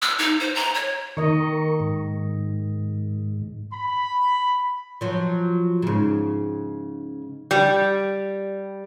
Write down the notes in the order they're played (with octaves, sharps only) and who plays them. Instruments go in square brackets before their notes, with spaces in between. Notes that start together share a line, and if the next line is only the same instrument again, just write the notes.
[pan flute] E6
D#4
C5
A#5
C#5
[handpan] D#3 D#5 [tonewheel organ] A#4 C#6
[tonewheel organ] G#2
[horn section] B5
[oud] F3 F#3
G#2 C#3
[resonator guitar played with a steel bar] G3